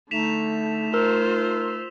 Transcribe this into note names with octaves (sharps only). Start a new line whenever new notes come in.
D3 A3 D#4 B6 E7 F7
F4 A#4 C5 E6